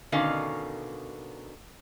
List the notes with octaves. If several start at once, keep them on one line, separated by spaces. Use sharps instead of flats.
B2 D3 D#3 C#4 F5